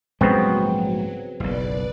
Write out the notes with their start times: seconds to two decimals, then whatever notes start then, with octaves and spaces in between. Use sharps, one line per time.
0.21 A#1 G#2 C#3 F#3 G3 B3 C4
1.40 F#1 B1 B4 D5